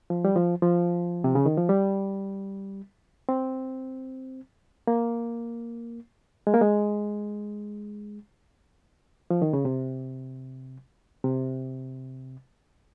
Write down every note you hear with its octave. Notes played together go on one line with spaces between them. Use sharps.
F3
G3
F3
F3
C3
C#3
D#3
F3
G3
C4
A#3
G#3
A#3
G#3
F3
D#3
C#3
C3
C3